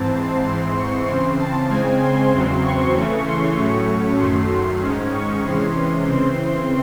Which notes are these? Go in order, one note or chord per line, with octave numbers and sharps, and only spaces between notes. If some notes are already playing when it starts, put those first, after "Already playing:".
Already playing: G#2 E3 C4 A5
C6
G#2 E3 C4 C6
C#6
C#3 E3 C4 C6
A5
C#3 G#3 C4 G#5
C6
E2 C#3 F#3 C4 C6
C#6
C#3 E3 A3 C#4
C6
A2 F#3 A3 C#4 C#6
F#2 D#3 F#3 A3 C6
G#2 D#3 G#3 C#4
C#6
C3 E3 G#3 C#4 C6
C#3 E3 C4 C6